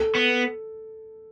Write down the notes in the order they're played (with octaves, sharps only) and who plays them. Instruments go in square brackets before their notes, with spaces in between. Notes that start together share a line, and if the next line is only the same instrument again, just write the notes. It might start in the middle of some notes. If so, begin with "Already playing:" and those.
Already playing: [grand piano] A4
[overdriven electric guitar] B3